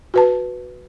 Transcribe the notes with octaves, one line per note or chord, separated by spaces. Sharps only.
F#4 B4 A5